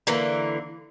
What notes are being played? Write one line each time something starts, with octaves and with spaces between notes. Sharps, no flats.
D3 E3 A#3